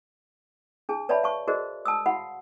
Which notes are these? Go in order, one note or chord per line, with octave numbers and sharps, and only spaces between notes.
D4 G#4 A5
B4 C#5 D5 E5 A5 B5
F5 A5 C#6
F#4 G#4 A#4 C5 D5 D#5
A5 D#6 E6
F#4 F5 F#5 B5